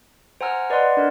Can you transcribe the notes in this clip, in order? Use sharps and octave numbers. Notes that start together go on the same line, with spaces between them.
C5 F#5 G#5 A#5 E6 F6
B4 D5 D#5 F#5 C6
D4 A#4